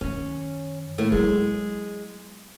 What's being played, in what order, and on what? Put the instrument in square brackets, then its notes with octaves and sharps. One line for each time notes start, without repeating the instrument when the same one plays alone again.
[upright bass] F#2 D#3 [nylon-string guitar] C#4
[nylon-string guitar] A2 A3 A#3
[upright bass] F#3 B3 [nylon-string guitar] G#3